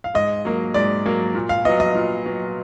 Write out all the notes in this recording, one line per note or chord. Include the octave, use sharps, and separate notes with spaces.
F5
G#2 D#5
F#3 A#3
G#2 D5
F#3 A#3
A#2
F5
F#3 B3 D#5
D#5
A#2
F#3 B3